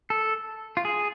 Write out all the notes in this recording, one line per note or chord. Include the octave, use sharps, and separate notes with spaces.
A4
F4
G#4